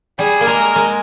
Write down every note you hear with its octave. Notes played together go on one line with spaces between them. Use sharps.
G3 G#4
A#3
G#3 A#4
G#3